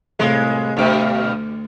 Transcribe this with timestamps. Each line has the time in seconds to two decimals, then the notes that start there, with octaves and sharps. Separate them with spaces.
0.19 C2 A2 G#3 F4
0.77 D2 G2 B2 D6